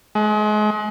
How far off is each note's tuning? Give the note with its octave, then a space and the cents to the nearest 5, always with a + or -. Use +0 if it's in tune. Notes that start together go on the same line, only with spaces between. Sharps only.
G#3 +35